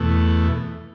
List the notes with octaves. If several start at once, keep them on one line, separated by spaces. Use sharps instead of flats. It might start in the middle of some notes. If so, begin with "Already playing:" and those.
Already playing: E2 B2 A3